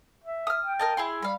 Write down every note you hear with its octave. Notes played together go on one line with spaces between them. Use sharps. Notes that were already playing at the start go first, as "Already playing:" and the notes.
E5
D#6 F6
G5
A#4 D#5 A5
E4 G#4 C6
G3 F5 B5